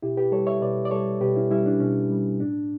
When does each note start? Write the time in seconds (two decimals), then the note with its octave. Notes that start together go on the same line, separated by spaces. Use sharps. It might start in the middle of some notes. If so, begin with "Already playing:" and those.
0.02 B2 E4 G4
0.17 G4 B4
0.32 G3 A4 C#5
0.47 C#5 E5
0.61 B2 B4 D5
0.85 D5
0.91 G3 A4 C#5
1.21 B2 G4 B4
1.36 C#4 E4
1.51 G3 C#4 E4
1.66 D4
1.80 B2 C#4
2.10 G3
2.40 A2 D4